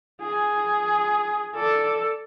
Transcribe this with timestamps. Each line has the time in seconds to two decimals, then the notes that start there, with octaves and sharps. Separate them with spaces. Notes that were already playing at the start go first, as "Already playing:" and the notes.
0.21 G#4
1.55 A4 D5